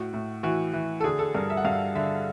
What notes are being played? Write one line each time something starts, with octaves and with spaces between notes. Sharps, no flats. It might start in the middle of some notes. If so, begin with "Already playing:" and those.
Already playing: A2 F#4
A2
E3 F#4
E3
A4
D3 G#4
A4
G2 A#4
E5
F#5
G2 F5
D3 E5